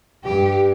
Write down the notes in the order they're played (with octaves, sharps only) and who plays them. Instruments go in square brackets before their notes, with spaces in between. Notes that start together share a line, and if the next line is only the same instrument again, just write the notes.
[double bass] G2 [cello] G4